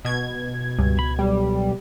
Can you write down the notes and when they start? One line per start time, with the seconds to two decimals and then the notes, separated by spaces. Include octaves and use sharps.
0.05 B2 G#6
0.79 C#2 G2
0.99 B5
1.19 B1 G3